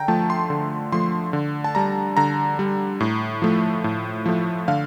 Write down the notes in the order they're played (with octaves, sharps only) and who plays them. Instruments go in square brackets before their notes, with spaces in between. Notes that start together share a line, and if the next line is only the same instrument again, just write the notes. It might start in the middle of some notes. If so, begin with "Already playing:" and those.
Already playing: [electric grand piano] D3 G5 A#5
F3 A3 A5
C6
D3
F3 A3 C6
D3
A5
G3 A#5
D3 A#5
G3
A2
F3 A3
A2
F3 A3
D3 F5